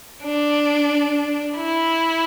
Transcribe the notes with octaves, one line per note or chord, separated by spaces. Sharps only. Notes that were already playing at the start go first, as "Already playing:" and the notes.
D4
E4